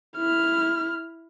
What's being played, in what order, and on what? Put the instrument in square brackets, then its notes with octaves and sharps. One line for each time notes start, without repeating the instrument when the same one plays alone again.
[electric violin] E4 F6